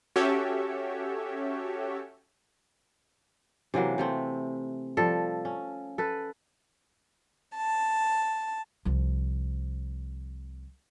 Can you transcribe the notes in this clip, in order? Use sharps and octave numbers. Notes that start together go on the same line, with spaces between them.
C#4 F#4 G4 A4 C#5 E5
C3 E3 F#3 A#3
C3 A3 C4
F3 G3 A4
C#4
A4 B4
A5
C2 F3